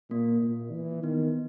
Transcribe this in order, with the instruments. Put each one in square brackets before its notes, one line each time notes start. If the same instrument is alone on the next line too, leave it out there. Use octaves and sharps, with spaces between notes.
[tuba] A#2 [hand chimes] A#3
[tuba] A#2
E3
[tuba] D#3 [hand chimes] B3